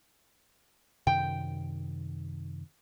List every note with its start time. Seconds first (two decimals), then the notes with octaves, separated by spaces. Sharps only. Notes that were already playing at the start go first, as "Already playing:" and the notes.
1.07 F#2 C3 D#3 G5